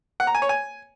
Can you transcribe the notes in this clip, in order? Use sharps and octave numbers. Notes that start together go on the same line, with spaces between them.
F#5
A#5
G#5
C#5
G#5